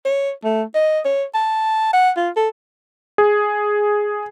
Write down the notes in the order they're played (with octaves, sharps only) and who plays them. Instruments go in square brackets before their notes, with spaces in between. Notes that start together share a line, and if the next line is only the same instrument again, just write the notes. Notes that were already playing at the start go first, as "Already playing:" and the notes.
[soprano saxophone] C#5
A3
D#5
C#5
A5
F#5
F4
A4
[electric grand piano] G#4